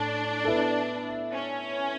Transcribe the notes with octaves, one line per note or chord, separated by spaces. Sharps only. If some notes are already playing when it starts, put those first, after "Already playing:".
Already playing: A2 D4
B3 E4 A4
C#4